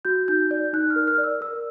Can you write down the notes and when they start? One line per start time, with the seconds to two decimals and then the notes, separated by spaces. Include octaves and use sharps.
0.05 F#4 G6
0.28 D#4 G6
0.51 D5 G6
0.73 D#4 F#6
0.90 F6
0.96 A#4
1.07 F6
1.18 D5
1.24 E6
1.41 A#4 E6